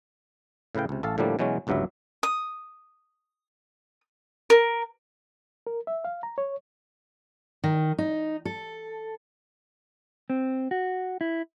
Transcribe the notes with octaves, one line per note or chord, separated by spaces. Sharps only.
A2 C#3 B4 F5 G5
C#2 C3
A1 A4 F5 A5
A2 D3 F3 G3 A#3
B2 E3 F#3 G#3 C#4
G1 C#2 G2 F#3 E4 E5
D#6
A#4
A#4
E5
F5
A#5
C#5
D#3
D#4
A4
C4
F#4
E4